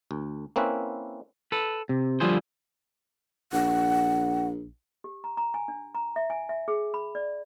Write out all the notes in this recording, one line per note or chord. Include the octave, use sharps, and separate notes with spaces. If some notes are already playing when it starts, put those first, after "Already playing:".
D2
A#3 C4 C#4 E4 B4
A4 B4
C3
D3 F3 G3 F4 G#4 C5
A#1 F#5
G4
A#5
A#5
G#5
D4
A#5
E5
G#5
E5
G#4
B5
D5